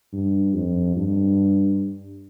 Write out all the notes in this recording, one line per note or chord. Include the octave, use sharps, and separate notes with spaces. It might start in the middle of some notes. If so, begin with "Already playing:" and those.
G2
F2
G2